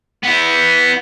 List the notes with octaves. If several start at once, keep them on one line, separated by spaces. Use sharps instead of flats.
B3 E4